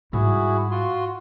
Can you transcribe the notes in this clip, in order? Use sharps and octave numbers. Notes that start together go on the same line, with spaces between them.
G#2 G3 E4 F#4 G#4
F4 F#4 C6